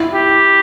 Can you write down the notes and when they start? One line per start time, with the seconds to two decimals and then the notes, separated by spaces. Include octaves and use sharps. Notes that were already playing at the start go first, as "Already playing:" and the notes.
Already playing: E4
0.13 G4